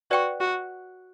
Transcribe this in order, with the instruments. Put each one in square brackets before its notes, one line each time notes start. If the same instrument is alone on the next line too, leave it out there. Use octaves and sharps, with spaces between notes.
[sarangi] F#4 [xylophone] B4 D5 G5 C#6
[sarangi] F#4